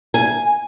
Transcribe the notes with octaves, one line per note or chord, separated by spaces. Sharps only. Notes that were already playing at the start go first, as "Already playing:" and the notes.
G#5